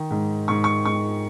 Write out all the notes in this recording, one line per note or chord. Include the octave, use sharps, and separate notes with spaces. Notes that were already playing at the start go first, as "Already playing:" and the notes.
Already playing: D#3
G#2
G#2 C#6
C#6
G#2 C#6